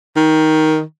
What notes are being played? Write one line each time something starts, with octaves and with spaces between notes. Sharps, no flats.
D#3